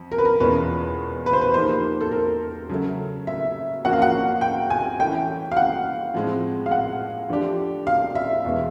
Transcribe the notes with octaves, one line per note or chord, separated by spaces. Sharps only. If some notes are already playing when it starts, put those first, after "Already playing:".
Already playing: F2
A#4
B4
A#4
E2 B2 G#3 C#4 F4 B4
B4
C5
B4
F3 A#3 D#4 G4 C5
A4
A#4
C#3 F#3 A3
E5
F3 A#3 C#4 F#4 F#5
F5
F#5
G5
G#5
E3 A3 C#4 E4 G5
F5
F#5
A2 F3 G#3 C4
F5
F#5
D3 F3 A3 D4 G4
F5
E5
E2 B2 G#3